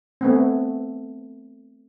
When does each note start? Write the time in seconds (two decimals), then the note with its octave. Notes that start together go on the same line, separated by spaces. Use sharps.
0.21 A3 B3 C4